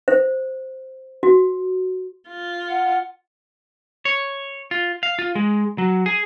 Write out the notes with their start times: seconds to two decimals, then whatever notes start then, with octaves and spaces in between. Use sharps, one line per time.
0.08 C5
1.23 F#4
2.29 F4
2.69 F#5
4.05 C#5
4.71 F4
5.03 F5
5.19 F4
5.35 G#3
5.78 F#3
6.06 G#4